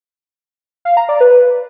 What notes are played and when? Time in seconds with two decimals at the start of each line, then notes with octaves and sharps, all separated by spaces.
0.85 F5
0.97 A#5
1.09 D5
1.21 B4